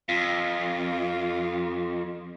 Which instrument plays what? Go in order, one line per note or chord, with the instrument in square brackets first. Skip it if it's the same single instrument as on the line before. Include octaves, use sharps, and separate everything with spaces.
[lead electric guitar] F2 [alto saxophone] F4